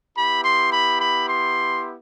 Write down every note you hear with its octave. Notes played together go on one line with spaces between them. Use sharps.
B3 E4 G4 B5
C6
B5
B5
C6